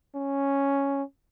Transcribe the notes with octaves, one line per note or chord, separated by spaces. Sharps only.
C#4